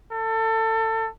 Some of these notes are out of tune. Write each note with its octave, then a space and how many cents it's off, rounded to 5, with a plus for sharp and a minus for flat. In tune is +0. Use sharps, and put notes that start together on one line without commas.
A4 +25